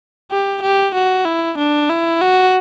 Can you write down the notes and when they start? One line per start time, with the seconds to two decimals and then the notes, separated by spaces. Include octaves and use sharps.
0.31 G4
0.62 G4
0.94 F#4
1.25 E4
1.58 D4
1.89 E4
2.21 F#4